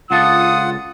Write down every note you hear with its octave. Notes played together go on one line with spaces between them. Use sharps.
C#2 D4 F4 A4 F#5 D#6